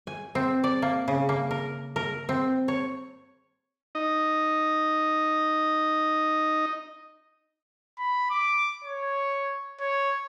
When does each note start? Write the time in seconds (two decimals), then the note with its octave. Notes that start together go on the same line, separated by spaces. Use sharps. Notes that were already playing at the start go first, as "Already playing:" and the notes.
0.07 G#5
0.35 C4
0.64 D5
0.82 A#3
1.08 C#3
1.29 A#3
1.51 A#4
1.96 A#4
2.29 C4
2.68 C#5
3.95 D#4 D#5
7.98 B5
8.30 D6
8.84 C#5
9.80 C#5